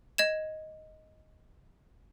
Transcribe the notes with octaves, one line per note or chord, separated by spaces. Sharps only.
D#5 G#6 E7